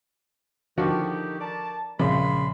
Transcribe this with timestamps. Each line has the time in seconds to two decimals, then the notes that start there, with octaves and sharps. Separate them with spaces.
0.78 D3 D#3 F3 F#4 G4
1.40 A#4 D5 A5
1.99 A#1 C#3 G#3 B5 C6